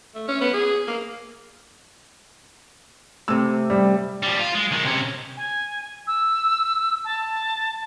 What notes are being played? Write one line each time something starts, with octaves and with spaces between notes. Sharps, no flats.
A3
C#4
B3
G#4
A#3
C3 A3 E6
G3
F3 G3
F4
G#3
D#3 G#3
C3 C#4
G#5
E6
A5